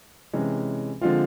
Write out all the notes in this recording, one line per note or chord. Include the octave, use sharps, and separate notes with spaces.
C3 E3 G#3 C#4
D3 F3 G#3 C4 F4